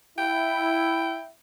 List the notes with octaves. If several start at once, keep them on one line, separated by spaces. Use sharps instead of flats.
E4 G5